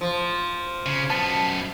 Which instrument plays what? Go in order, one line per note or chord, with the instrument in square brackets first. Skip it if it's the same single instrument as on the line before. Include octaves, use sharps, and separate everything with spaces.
[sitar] F3
[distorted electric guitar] C#3
[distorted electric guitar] F#2 B3 [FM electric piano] A5